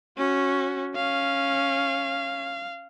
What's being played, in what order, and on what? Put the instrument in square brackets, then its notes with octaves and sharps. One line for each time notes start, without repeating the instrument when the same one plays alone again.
[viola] C#4 [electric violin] F#4
[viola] C#4 [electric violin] F5